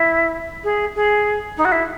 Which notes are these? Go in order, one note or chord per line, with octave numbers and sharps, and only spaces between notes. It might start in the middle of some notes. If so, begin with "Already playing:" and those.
Already playing: E4
G#4
G#4
D#4
F#4
E4